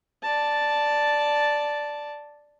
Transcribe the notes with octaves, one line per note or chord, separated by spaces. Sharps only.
D5 A5